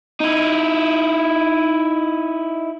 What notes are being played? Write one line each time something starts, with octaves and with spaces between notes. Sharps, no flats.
D#4 E4